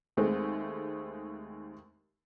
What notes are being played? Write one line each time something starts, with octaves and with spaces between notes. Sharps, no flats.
D#2 G#3 A3 C4